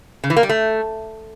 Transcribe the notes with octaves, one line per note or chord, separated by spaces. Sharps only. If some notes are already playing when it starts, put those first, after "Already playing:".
C#3
E3
A#3
G3
A3